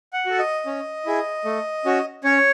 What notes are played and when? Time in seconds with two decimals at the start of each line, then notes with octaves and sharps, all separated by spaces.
0.13 F#5
0.26 F#4 A4
0.39 D#5
0.66 C#4
1.06 E4 G#4
1.45 A3
1.85 C#4 F#4
2.24 C#4 C#5